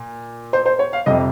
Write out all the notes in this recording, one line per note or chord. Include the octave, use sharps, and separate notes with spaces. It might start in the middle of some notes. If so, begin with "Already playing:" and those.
Already playing: A#2
C5
C5
C#5
F5
F2 C3 G3 D#5